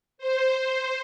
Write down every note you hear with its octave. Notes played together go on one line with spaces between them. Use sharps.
C5